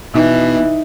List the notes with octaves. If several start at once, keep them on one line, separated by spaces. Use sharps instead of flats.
B2 E3 D#4